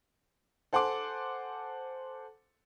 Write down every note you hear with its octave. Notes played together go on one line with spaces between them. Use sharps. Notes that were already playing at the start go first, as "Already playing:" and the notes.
A4 C5 F#5 G#5 C6 D6